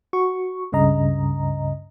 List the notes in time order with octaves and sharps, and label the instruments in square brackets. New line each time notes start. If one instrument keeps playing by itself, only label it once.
[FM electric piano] F#4 C#6
C#2 G2 C#3 D#5 A#5